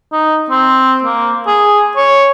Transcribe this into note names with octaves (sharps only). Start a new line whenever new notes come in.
D#4
C4
A#3
G#4
C#5